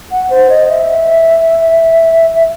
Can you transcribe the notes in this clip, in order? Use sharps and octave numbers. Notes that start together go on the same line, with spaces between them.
F#5
C5
D#5
E5
E5